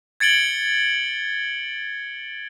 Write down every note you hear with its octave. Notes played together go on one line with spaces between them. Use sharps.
G#6 A6 C#7 D7 F#7 G7